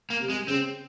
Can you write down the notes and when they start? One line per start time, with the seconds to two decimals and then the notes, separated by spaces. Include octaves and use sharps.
0.10 A#3
0.21 C3
0.29 G#3
0.48 C#3 C4